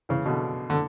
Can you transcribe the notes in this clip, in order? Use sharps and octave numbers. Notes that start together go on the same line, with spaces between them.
C#3 E3
B2 D3
D3